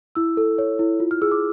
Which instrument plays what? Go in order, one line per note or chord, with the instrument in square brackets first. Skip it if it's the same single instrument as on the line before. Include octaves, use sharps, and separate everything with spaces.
[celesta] E4 E6
A4
C#5
E4
F4
F6
G#4 E6
D6